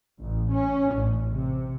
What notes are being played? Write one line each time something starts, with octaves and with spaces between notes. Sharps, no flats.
A1
C#4
A1
C3